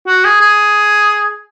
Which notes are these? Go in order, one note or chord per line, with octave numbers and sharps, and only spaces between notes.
F#4
G#4
G#4